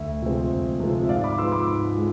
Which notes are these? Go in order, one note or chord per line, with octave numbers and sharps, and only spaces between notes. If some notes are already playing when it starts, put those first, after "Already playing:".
Already playing: D2 E5
C3 F3 G#3 C4
D2
C3 F3 G#3 C4
E5
G#2 D5 F5
B5 D6
F3 G#3 B3 C6 E6
B5 D6
G#2
F3 G#3